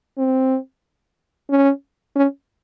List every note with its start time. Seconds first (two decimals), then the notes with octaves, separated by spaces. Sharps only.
0.18 C4
1.50 C#4
2.16 C#4